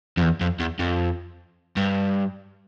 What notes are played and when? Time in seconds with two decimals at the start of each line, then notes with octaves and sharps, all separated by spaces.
0.17 F2
0.22 E2
0.41 F2
0.60 E2
0.79 F2
1.77 G2